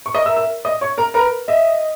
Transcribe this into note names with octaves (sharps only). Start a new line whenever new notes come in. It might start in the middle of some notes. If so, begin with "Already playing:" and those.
C#6
A#4 D#5 D#6
E5 E6
E5 E6
D#5 D#6
C#5 C#6
A#4 A#5
A#4 B4 A#5
D#5 E5